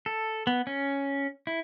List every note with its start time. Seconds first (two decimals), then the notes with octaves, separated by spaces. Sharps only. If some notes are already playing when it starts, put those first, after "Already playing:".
0.06 A4
0.47 B3
0.67 C#4
1.47 E4